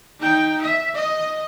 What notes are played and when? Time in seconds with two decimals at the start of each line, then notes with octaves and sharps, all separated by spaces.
0.20 D#4 G5
0.61 E5
0.95 D#5